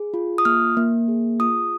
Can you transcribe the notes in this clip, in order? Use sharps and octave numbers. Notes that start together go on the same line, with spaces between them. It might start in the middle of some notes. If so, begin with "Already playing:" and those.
Already playing: G#4
F4
D#6
A#3 F6
A#3
G#4
F4 D#6